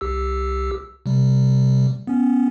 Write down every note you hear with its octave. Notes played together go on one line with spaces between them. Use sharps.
C2 G4 E6
C3 G3
B3 C#4